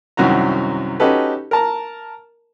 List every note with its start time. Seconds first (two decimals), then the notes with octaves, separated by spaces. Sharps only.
0.17 C2 F#2 D#3 F#4 A#5
1.00 C#4 D#4 F#4 G4 A4 B4
1.51 A#4 A5 A#5